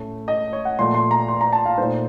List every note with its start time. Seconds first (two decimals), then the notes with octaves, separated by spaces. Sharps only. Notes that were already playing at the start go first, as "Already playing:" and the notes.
Already playing: A2 A3 C#4
0.28 D#5
0.53 C#5
0.65 F#5
0.79 A#2 F3 A3 C6
0.94 C6
1.11 A#5
1.28 C6
1.41 A#5
1.53 A5
1.65 F5
1.78 A#2 A3 D#4 C5